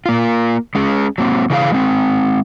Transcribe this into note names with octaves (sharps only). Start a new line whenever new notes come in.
A#3 F4
G#3 C#4 G#4
F#3 A#3 C4
C#3 E3 G#4 F5
G#3 C4